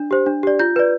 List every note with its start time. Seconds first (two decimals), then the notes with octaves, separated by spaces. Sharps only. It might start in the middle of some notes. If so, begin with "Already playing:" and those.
Already playing: D4
0.11 G4 C5
0.26 D4
0.43 G4 D5
0.59 F4 G6
0.76 B4 D5